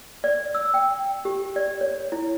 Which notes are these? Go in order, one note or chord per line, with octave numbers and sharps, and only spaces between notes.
D5
E6
G5
G4
D5
C#5
E4